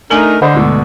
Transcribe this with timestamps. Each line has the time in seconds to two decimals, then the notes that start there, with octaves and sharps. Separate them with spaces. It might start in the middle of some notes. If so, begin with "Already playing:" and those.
0.10 A3 D4 D#4 A#4 G#5 F#7
0.42 D3 C5 D#5 B5
0.54 D2 G#2 B2